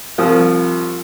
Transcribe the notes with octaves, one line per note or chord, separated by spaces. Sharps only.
C2 F3 D#6